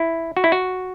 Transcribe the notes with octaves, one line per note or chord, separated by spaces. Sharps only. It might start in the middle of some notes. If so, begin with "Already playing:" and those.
Already playing: E4
F#4
E4
F#4